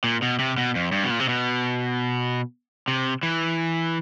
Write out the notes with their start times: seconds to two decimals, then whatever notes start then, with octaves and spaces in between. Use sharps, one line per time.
0.04 A#2
0.22 B2
0.39 C3
0.58 B2
0.75 F2
0.92 G2
1.03 B2
1.11 A#2
1.20 C3
1.29 B2
2.88 C3
3.23 E3